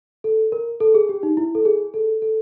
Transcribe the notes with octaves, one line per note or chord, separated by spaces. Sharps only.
A4
A#4
A4
G#4
G4
D#4
E4
A4
G#4
A4
A4